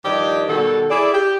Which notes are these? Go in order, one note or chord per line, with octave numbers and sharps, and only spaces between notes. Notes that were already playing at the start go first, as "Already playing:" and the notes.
G2 D#3 F3 G4 D5 D#5
B2 D#3 G3 F#4 A4
E4 G#4 D5
G4